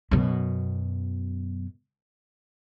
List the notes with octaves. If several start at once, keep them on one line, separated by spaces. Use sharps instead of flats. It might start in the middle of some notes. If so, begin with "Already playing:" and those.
F#2 B2